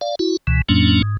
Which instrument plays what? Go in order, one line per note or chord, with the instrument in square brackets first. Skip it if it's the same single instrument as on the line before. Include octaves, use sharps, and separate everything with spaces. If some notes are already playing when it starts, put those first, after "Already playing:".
[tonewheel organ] D5 F5
E4 F#4
C#2 B2 E3
F2 A2 F#3 A#3 C#4 D4
G#2